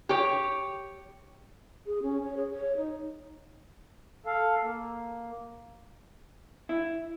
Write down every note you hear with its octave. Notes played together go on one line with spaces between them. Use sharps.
G4 C#5
G#4
C#4
C#5
G#4
C#5
D#4
A4 F5
A#3
E4